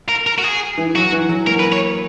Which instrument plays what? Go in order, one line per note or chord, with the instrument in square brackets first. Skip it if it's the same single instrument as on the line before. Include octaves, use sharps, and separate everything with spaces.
[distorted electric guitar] A#4
A#4
F#4
G#4
[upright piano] E3
[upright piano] F#3 [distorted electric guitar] F#4
[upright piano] E3
F#3
[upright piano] A#3 [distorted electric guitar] A#4
[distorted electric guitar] B4
C#5